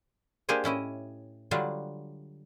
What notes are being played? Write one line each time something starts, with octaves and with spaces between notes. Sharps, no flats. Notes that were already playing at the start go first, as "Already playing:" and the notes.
A#3 D4 G4 G#4 C5 G#5
A2 C#4 E4 D#5
D3 F#3 G3 D4 F4